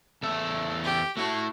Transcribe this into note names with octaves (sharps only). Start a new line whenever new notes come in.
E2 A4 E5
G4
A3 E4 F#4 A4